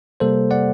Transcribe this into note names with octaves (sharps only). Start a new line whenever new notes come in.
C3 G3 A#3 A4 C5
D5 F#5